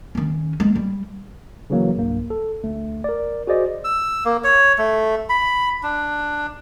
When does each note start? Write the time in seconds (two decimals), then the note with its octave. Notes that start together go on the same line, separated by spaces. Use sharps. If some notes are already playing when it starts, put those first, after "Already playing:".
0.15 D#3 C#4
0.60 G#3
0.76 G3
1.70 C#3 E3 F#3 A#3
1.96 B1 G2 A#3
2.30 A4
2.63 D2 A3
3.04 A#4 D5
3.47 F#4 G#4 C5 D5 D#5
3.84 E6
4.25 A#3
4.44 C#5
4.78 A3
5.29 B5
5.83 D4